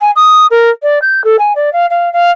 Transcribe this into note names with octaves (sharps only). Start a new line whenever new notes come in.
G#5
D#6
A#4
D5
G6
A4
G#5
D5
F5
F5
F5